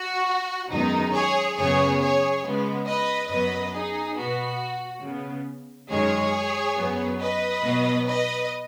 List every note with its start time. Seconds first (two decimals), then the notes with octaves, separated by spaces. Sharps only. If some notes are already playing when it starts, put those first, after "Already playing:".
Already playing: F#4
0.70 F#2 D#3 G#3 B3 D#4
1.13 G#4 C#5
1.57 F#2 C#3 B3 G#4 C#5
2.00 G#4 C#5
2.44 C#3 G#3 B3
2.86 B4 D#5
3.30 F#2 F#3 B3 B4 D#5
3.73 D#4 G#4
4.16 B2 B3 F#4
5.03 C#3 B3
5.89 F#2 D#3 G#3 G#4 C#5
6.76 F#2 F#3 B3
7.20 B4 D#5
7.63 B2 F#3 B3
8.06 B4 D#5